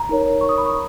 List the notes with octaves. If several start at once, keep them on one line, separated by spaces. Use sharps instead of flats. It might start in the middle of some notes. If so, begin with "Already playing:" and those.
Already playing: A#5
D#4 A#4 C#5
C#6
D#6
B5
C#6